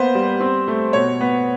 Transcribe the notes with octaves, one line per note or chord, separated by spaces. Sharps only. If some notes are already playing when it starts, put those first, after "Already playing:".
Already playing: A#3 B3 C5
G3
C4
A3
B2 C#5
B3